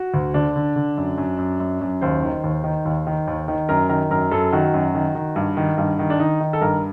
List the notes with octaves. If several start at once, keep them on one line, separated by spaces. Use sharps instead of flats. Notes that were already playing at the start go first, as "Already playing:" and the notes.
Already playing: F#4
D2
D3 D4
D3
D3
F#2
F#2
F#2
F#2
F#2
D#2 C5
D#3
D#2
D#3
D#2
D#3
D#2
D#3
F#2 A#4
D#3 A#4
F#2 A#4
F#2 A4
D#3 F#4
F#2
D#3
D#3
G2
D#3
G2
D#3
D4
D#3 D#4
D#3
A4
G2 A#4